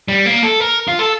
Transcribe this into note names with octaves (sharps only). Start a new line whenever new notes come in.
G3
A#3
A4
A#4
F4
A4